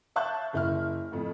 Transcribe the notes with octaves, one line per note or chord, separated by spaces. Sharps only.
E5 F5 A5 C#6 F#6 G6
F#1 E4 F6
F2 A2